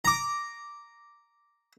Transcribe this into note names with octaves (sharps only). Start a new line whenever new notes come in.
A#5 D6